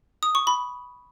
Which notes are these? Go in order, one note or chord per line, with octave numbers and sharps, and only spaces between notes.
D#6
C#6
B5